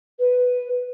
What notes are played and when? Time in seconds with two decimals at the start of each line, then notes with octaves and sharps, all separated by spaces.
0.19 B4